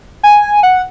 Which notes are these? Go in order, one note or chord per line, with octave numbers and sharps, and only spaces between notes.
G#5
F#5